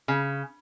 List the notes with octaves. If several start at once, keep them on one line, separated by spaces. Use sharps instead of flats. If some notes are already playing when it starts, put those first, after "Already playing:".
C#3